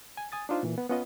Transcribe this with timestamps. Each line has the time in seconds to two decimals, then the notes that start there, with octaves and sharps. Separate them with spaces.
0.17 G#5
0.32 G#5 D#6 A6
0.49 D4 D#4 F4 C5
0.63 A#2 E3
0.78 B3
0.90 B3 C#4 F4 D#5